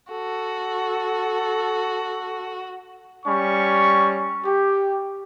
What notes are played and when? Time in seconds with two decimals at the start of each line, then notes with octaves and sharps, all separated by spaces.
0.11 F#4 A4
3.26 G3 C#4 C#6
4.45 G4